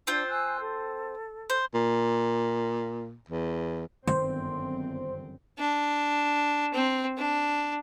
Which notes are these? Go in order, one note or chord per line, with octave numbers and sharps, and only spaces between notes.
C4 D4 F4 C5
G#5 E6 F#6
A4
C5
A#2
E2
G1 F#2 D#3 B3 C4 C5
D4
C4
D4